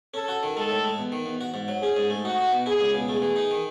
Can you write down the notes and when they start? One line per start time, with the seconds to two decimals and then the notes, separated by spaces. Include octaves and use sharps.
0.14 C#4 A4
0.28 F#4
0.43 D#3
0.56 G#3 A4
0.71 A2
0.84 G#3
0.98 E2
1.12 D#3
1.26 E2
1.41 F#4
1.54 G#2
1.68 F#3
1.82 C#4 G#4
1.96 G#2
2.10 A3
2.24 D#4 F#4
2.38 D#4
2.52 B2
2.66 E4 G#4
2.81 C#2
2.94 B2
3.08 A3 G#4
3.22 E3
3.36 D#4
3.51 D#3